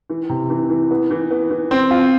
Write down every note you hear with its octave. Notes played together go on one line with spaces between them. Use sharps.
E3
C3
E3
E3
B3
E3
B3
E3
C4
F4